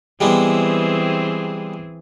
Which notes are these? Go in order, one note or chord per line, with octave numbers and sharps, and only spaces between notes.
E3 G3 G#3 B3 C4 G#4